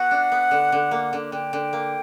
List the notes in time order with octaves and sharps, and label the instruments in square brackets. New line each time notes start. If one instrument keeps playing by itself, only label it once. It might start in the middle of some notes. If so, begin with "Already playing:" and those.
Already playing: [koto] B3 F#4 [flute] F#5
[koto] D4
B3
D3
D3
A#3
D3
[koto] D3 [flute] G5
[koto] D3
A#3